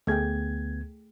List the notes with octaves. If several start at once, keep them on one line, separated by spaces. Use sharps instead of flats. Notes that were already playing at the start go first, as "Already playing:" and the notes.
D2 A3 B3 G#4 G5 G#6